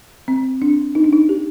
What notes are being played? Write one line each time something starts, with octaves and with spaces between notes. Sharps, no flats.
C4
D4
D#4
D4
D#4
G4